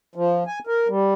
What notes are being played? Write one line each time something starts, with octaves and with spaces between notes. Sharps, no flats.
F3
G#5
A#4
G3